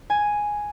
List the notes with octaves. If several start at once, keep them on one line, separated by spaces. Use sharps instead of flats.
G#5